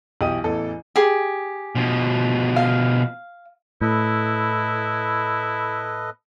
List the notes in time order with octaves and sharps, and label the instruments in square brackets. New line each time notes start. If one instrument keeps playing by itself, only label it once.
[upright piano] B1 E3 G4 D#6 D#7
A1 E2 E3 A4
[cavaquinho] G4 G#4
[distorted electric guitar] B2 F3
[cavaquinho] F5
[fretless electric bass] A2 [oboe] E4 [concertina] A4 B4 D#5